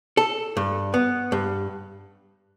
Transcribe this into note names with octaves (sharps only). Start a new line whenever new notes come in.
A4
G2
B3
G2